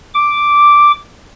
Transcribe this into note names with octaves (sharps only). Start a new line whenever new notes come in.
D6